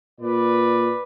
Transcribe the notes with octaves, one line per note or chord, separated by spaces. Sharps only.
A#2 B4 D5